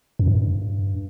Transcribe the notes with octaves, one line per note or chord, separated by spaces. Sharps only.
F#2
G2